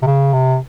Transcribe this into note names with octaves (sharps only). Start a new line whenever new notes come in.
C3
C#3
C3